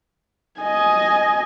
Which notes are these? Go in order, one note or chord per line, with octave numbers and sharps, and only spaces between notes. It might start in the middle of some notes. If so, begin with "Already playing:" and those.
D#5 G#5